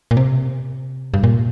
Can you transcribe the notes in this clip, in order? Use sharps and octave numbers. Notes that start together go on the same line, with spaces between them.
A#2
C3
G2
A#2